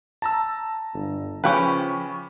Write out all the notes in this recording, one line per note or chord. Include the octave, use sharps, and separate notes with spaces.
A5 A#5 E6
G1
C#3 F3 C#4 G4 B4 C#6